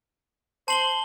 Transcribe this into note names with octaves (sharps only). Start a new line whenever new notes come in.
C5 A5 C6 F#7 G7